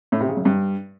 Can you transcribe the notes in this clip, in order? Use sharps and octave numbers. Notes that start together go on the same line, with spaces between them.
A2
C3
C#3
F#2
G2